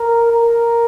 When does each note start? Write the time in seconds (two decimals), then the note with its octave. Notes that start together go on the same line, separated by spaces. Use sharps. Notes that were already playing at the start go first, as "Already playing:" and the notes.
Already playing: A#4
0.33 A#4